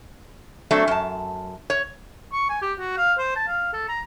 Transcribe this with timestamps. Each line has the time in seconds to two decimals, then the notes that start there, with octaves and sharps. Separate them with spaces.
0.71 F#3 A3 C4 D4
0.88 F#2 A5
1.70 C#5
2.33 C#6
2.49 G#5
2.62 G4
2.79 F#4
2.97 F5
3.19 C5
3.36 A5
3.48 F5
3.73 A4
3.89 A#5